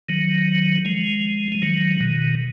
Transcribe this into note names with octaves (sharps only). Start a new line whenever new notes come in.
D#3 F#3
F3 G#3
G#3
D#3 F#3
B2 D#3